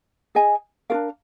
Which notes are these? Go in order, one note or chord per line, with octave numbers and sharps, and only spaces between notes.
G#4 D#5 G#5
D4 F4 A#4 F5